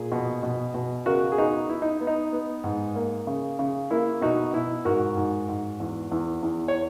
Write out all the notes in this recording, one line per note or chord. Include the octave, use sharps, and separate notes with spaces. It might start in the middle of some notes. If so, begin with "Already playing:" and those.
Already playing: A#2 G#4
B2
B2
B2
C#3 F#4 A#4
G#4
B3 D#4 F#4
B3 E4
D#4
B3
D#4
B3
G#2
A#3
C#3
C#3
A#3 E4
B2 D#4 F#4
B2 E4
G#2 F#4 A#4
G#2
G#2
E2
E2
E2
C#5